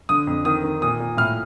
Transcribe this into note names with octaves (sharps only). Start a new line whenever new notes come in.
D3 D#6
F2
D#3 D#6
D#3
A#2 D#6
A#2
A2 F6